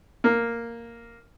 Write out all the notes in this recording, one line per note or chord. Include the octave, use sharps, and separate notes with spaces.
A#3